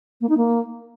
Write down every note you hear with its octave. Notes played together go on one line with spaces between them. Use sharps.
A#3
D#4
A#3